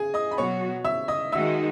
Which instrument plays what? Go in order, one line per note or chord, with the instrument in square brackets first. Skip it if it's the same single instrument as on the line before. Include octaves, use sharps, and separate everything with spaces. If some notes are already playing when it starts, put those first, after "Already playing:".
Already playing: [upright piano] G#4 G#5
D#5 D#6
B5
[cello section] B2 F#3 B3 F#4 [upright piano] C#5 C#6
[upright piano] E5 E6
D#5 D#6
[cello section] D#3 G#3 D#4 F#4 [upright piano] E5 E6